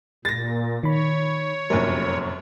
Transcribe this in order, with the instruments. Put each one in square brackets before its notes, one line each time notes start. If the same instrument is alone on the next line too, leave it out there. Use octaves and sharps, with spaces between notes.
[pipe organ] A#2 [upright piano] A6 A#6
[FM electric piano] D#3 B5 [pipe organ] C#5
[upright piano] F1 A#1 F#2 [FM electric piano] A#4